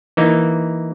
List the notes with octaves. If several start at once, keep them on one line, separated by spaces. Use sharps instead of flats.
E3 A#3 D#4